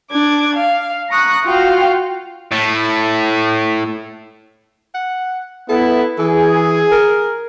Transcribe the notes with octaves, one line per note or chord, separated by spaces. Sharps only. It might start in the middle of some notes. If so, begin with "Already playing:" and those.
D4 D6 G#6
F5
A#5 C#6 D#6 F#6
F4 F#4 F5 G5
A2 A3
F#5
B3 E4 A4
E3 G#4
A#4